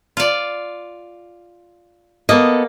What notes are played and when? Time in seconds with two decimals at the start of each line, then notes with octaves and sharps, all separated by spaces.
0.17 F4 D5
2.29 A#3 B3 A4 D#5